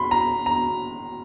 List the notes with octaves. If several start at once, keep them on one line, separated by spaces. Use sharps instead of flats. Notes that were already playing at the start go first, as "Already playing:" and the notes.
Already playing: B5 C6
A#5
A#5